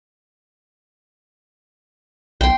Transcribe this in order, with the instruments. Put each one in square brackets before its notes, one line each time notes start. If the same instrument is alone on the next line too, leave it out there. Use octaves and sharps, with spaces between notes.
[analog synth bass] B1 [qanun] G5 C6